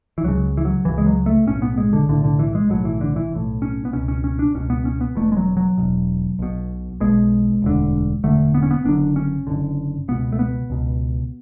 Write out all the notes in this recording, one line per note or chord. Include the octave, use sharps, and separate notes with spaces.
E3
C#2 C#3 F#3
E3
F#3
C#2 C#3 E3
G#3
F#3
A3
B1 A2 C#4
B3
G#3
D3
B1 A2 D3
D3
E3
G#3
B1 A2 F#3
E3
D3
E3
B1 A2
C#4
B3
C#2 B2 C#4
C#4
C#4
D4
C#2 B2 C#4
B3
C#4
B3
E1 E2 B2 A3
G#3
F#3
F#3
E1 E2 B2
B1 B2
B1 B2 G#3
E1 D2 D3
E1 D2 D3 A3
B3
C#4
B3
F#1 F#2 D3 D4
C#4
F#1 F#2 D3
C#2 B2 B3
A3
B3
C#2 B2